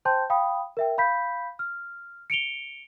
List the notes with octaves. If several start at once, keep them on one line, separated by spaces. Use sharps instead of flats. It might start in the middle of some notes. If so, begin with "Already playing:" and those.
C5 G5 A5 C6 G6
F5 G5 B5 D#6
A#4 E5 G5
F5 B5 G6 B6
F6
C#7 D7 F7 G7